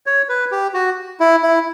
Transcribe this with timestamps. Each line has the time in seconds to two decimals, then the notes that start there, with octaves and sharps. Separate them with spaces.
0.06 C#5
0.29 B4
0.51 G4
0.74 F#4
1.20 E4
1.43 E4